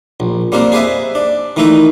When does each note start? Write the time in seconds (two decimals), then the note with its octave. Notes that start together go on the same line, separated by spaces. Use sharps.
0.20 A#1
0.52 G3 A#3 C4 D4 A#4
0.72 G#4 B4 C5 D#5 E5
1.15 D4
1.57 D#3 E3 A3 D#4 B4 E5